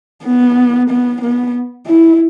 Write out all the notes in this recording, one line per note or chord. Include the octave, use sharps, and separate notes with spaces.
B3
B3
B3
E4